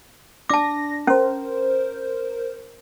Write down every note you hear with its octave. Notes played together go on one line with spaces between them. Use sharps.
D4 A5 D6 A#6
C#4 A#4 C5